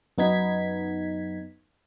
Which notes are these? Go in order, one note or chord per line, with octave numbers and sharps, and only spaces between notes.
F#2 B3 D#4 G#6 B6